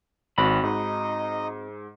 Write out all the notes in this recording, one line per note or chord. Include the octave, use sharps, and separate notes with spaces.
G#1 C4 F#4 B5
G#2 D#4 D#5